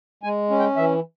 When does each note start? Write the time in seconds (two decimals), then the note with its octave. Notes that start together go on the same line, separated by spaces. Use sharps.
0.23 G#3 G#5
0.50 C#4
0.59 G5
0.76 E3 E5